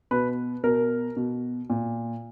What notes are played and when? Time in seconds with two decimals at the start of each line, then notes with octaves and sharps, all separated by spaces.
0.11 B2 B4
0.64 B2 A#4
1.16 B2
1.70 A#2